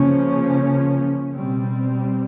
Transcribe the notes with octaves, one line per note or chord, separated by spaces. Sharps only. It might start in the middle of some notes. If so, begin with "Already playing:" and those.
Already playing: C#3 F3 A#3 C#4
B2 G3 C4